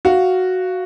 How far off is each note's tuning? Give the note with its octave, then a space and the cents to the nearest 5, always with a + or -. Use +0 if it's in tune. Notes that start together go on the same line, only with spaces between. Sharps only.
F#4 +0 F5 -5